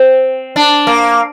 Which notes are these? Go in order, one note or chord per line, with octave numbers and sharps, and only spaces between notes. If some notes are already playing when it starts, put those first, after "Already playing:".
Already playing: C4
D4
A#3